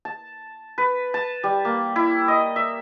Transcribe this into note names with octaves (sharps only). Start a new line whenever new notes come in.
A5
B4
A5
G3
A#3
E4
D#5
E5